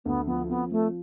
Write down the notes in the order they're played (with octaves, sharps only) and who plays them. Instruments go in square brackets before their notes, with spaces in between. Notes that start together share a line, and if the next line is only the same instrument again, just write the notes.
[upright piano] D2 [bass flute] B3
[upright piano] F3 [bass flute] B3
[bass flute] B3 [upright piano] C4
[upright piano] F3 [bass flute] A3